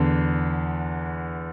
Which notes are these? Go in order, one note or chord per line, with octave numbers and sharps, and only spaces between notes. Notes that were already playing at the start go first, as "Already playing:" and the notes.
Already playing: E2 D3